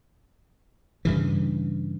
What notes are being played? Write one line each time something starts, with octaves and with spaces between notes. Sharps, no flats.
G2 C#3 E3